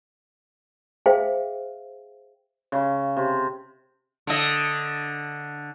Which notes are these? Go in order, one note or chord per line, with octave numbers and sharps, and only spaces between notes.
G#4 C5 E5 F5 G5
C#3
C3
D3 D#5